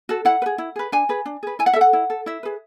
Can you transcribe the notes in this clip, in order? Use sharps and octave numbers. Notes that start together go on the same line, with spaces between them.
F#4 A4
E4 F#5
B4
G#4
E4
G#4 B4
D4 G#5
G#4 B4
D4
G#4 B4
E4 G#5
F#5
A4 E5
F#5
E4
A4
E4 E5
G#4 B4